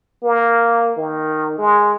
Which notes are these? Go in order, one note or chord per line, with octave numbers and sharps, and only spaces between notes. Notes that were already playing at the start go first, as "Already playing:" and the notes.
A#3
D#3
G#3